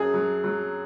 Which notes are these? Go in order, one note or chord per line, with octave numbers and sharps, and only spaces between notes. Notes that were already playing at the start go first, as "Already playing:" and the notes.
Already playing: F#2 F#3 G#4
F#3
F#3